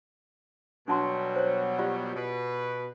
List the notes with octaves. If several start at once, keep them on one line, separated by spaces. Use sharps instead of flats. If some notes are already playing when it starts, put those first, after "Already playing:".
B2 F#3 G3 D4 A5 C6
C5 C#5
F4 G4 D5
B2 B4